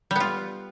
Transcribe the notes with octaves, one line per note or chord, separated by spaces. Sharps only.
G3 B3 F4